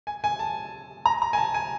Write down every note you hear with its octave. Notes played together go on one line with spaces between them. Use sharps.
G#5
G#5
A5
A#5
A#5
G#5
A5
G#5